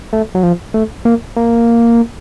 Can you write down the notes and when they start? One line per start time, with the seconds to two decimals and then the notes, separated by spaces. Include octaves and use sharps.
0.13 A3
0.35 F#3
0.43 F3
0.74 A3
1.05 A#3
1.36 A#3